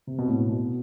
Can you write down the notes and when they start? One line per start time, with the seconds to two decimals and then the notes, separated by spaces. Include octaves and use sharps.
0.07 C3
0.18 B2
0.28 A2
0.49 B2